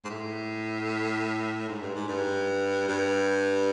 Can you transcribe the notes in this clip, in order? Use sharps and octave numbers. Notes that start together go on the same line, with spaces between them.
G#2
A2
G#2
G2
G#2
G2
G2